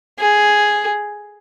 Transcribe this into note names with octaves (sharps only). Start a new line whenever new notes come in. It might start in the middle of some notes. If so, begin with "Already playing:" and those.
G#4